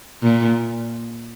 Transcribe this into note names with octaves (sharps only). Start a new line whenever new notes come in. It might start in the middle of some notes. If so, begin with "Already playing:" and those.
A#2